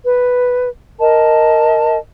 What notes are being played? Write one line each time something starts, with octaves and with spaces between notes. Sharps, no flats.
B4
A#4 D#5 A5